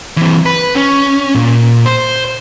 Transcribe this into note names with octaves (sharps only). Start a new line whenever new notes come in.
E3 C4
B4
C#4
A#2
C5